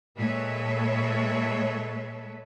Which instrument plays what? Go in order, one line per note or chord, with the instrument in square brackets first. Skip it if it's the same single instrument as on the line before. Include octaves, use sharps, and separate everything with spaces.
[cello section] A#2 G#3 A4 B4 C#5 E5